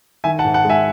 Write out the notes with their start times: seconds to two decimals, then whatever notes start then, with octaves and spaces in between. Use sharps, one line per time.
0.24 D#3 E5 G#5
0.39 F#5 A5
0.44 G#2
0.54 F#5 A5
0.65 G#3 E5 G#5